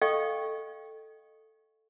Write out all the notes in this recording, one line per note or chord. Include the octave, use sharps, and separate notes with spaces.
A4 D#5 F5 G5 C#6